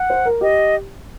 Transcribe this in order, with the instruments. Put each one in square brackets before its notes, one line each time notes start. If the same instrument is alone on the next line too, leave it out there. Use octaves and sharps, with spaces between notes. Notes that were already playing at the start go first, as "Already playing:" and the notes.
Already playing: [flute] F#5
[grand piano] C5
A#4
[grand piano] G4 [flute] D#5